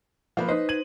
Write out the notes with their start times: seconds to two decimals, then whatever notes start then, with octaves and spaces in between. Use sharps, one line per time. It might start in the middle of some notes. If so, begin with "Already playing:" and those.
0.37 F3 A#3 B4
0.49 D#4 B4 C5 D#5
0.69 G#6 D#7 F#7